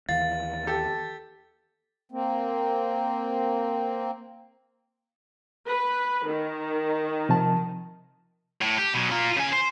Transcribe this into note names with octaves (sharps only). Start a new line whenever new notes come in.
D#2 E3 F5 A6
G4 A4
A#3 C4
B4
D#3
C3 F3 A5
A2
G4
B2 F#3
F4 A#5
C#3 G#5
C5